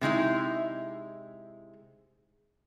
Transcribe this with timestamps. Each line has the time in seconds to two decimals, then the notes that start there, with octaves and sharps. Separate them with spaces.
0.01 C3 G#3 D#4 E4